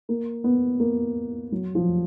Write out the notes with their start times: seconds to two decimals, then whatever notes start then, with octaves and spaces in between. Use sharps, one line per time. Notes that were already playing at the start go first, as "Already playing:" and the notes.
0.09 A#3
0.44 B3
0.80 A#3
1.52 F#3
1.75 F3